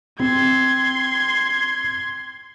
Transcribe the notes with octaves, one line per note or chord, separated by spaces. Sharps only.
C4 C6 G#6